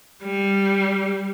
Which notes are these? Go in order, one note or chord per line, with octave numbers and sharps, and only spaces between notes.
G3